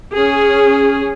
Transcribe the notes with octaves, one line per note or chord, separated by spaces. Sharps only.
C#4 G#4